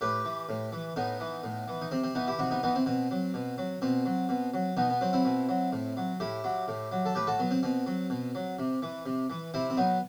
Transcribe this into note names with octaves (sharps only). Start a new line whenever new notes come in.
A2 G4 B4
E3
A2
E3
A2 B3 D#4
E3
A2
E3
D#4
C3 C4
C4
E3 B3 D#4
E4 G4
C3 D#4 F#4
B3 D#4
E3 B3 D#4
C4
B2 C4
F#3
B2
F#3
B2 C4
F#3
B2
F#3
B2 B3 D#4
B3
F#3 C4
C4 E4
B2
F#3
A2
F#3
A2 E4 G4
F#3
A2
F#3
A4
A2 G4 B4
F#4 A4
F#3 B3
C4
B2 C4
F#3
B2
F#3
C3
E3
C3
E3
C3 C4 E4
C4
F#3 B3 D#4